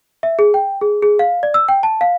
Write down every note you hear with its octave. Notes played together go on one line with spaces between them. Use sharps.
E5
G#4
G5
G#4
G#4
F5
D5
E6
G5
A5
F5